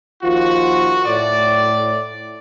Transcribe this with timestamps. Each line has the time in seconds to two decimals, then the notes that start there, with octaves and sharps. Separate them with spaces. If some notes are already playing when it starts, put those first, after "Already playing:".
0.23 D#2 F3 F4 F#4
1.06 A2 D5